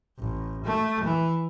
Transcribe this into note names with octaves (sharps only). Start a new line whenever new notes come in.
A1
A3
E3